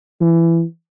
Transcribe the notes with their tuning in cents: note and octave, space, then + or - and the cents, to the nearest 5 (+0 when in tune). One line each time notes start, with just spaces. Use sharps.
E3 +15